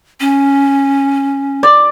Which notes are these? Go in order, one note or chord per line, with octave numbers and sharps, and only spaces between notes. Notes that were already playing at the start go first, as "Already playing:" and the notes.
C#4
D5